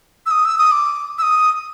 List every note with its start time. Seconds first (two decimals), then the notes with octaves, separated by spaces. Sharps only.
0.26 E6
0.31 D#6
0.45 E6
0.58 D#6
0.72 D6
1.18 E6
1.22 D#6